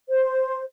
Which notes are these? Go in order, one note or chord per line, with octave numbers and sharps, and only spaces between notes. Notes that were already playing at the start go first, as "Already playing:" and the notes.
C5